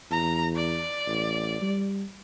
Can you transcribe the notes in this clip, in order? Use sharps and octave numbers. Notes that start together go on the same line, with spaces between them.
E2 A#5
D5
A1
G3